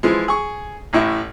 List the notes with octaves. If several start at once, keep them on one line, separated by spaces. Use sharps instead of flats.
E3 F3 G#3
G#4 C#6
A1 A2 E4